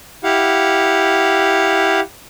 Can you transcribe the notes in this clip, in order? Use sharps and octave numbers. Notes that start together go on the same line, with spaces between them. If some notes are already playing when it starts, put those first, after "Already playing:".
E4 G4 F5 F#5